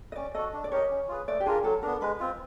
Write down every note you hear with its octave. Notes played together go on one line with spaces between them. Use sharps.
D#5
C#4 D5
F#4 A4 D#5
D4
D5
G4 A#4 C#5 D#5
C#4
F4 G#4 B4
A3 D5
G4
D4 F4 G#4 A#4
F#3 A4
B3 D4 A#4
G#3 B4
C4 F4